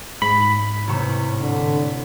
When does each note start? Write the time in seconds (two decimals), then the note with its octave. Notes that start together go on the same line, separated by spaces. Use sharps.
0.22 G#2 B5
0.87 A1 C3 C#6
1.40 D3